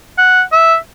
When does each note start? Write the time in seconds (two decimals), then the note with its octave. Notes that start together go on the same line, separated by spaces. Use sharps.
0.18 F#5
0.52 E5